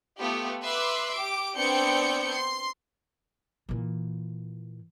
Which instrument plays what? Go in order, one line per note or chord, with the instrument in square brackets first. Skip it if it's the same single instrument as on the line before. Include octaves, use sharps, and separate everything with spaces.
[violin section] A3 B3 F4 G4
B4 E5 C6 D6 F#6
G4 D6 D7
B3 C4 D4 G5 G6 C#7
C6
[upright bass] A#2 E3